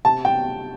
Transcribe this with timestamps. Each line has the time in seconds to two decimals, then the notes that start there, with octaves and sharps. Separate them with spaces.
0.05 C3 A5
0.25 G5